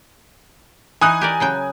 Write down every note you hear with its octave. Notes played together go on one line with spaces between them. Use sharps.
E3 D#4 G#5 D#6 F#6
G4 A#4 D5
C#3 F#3 G5